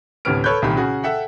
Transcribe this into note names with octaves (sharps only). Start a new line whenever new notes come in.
D2 A2 C3 B3 F6 D7
A4 B4 C#5 B5 F#6 G6
C2 A#2 D#3 G4 B5
C#3 F#4 G#4
A4 E5 F#5 G5